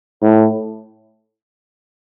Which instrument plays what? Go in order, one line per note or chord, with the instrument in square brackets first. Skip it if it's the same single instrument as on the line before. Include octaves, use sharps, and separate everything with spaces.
[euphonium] A2